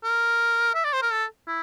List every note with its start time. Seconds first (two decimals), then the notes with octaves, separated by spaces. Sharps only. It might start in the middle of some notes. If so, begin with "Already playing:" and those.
0.04 A#4
0.74 E5
0.84 D5
0.93 C5
1.02 A#4
1.12 A4
1.48 E4